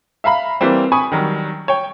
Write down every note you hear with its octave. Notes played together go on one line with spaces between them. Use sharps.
E5 F5 A#5 B5
E3 G3 A#3 C4
G#5 B5 C#6 D#6
D#3 F#3 G3
C#5 G5